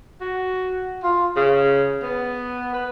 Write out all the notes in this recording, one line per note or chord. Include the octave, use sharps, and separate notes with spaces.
F#4
F4
C#3
B3
B4